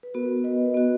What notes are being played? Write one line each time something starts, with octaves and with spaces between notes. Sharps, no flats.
B4
B3 F#4 A#4
B4 D#5
B3 F#4